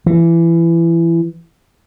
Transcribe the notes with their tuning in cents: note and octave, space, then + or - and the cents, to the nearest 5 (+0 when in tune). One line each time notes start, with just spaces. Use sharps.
E3 +20